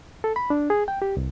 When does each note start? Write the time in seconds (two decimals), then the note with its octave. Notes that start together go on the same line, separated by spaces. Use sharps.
0.24 A4
0.36 B5
0.50 D4
0.70 G#4
0.88 G5
1.02 G4
1.17 C2